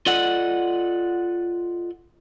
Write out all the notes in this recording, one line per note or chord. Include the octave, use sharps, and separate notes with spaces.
F4 A4 D5 D#5 F#5